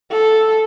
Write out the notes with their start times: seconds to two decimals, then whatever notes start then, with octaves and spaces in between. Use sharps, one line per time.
0.11 A4